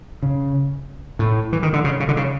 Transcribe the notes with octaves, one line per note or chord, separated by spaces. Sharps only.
C#3
A2
E3
D#3
D3
C#3
C#3
D3
C#3